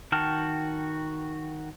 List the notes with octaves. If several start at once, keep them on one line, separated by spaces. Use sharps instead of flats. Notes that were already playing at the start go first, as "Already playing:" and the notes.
D#3 F#4 G5 A5 F6